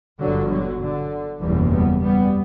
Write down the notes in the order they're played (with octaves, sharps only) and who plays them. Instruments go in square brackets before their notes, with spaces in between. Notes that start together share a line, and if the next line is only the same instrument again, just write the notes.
[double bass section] G1 G2 D3 F#3
D3 F#3
D3
F#1 E2 B2 E3 G3
G3 B3
G3 B3